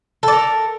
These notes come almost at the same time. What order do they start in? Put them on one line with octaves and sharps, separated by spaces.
A4 D5 A#4